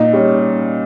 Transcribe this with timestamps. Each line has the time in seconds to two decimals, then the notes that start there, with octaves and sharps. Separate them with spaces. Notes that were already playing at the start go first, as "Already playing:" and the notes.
Already playing: A#2 D#4
0.13 G3 C#4